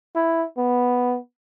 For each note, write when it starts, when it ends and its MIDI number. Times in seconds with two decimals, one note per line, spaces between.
0.15 0.45 64
0.58 1.17 59